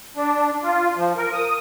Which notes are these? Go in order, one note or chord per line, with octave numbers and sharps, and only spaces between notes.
D4
F4
F3
A#4
D#6